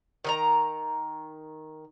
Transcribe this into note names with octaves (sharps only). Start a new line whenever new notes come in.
D#3 D#5 A#5